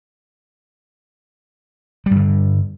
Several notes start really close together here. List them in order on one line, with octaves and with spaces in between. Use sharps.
G3 G2 D3